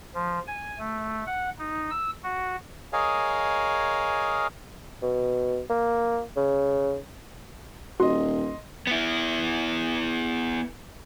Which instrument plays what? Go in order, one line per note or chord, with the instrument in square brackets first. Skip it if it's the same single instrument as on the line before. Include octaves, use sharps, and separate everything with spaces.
[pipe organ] F3
G#5
A3
F#5
D#4
E6
F#4
[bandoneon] G#4 A#4 C#5 D#5 F5 G#5
[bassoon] B2
A#3
C#3
[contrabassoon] D#1 [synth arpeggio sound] F#4 [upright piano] D#5 C6
[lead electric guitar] B3 E4